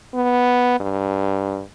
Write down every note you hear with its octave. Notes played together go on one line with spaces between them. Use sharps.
B3
G2